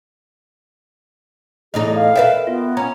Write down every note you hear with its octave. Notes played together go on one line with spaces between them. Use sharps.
E2 A2 D#4 G#4 D#5
F5
A#4 B4 D5 E5 G5
B3 F4
C#4 A#5